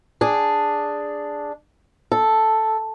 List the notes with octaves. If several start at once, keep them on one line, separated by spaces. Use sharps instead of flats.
D4 G#4
A4